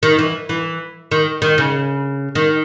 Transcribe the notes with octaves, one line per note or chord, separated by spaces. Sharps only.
D#3
E3
E3
D#3
D#3
C#3
D#3